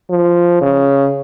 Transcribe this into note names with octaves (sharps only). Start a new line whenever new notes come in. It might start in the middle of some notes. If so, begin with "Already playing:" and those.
F3
C#3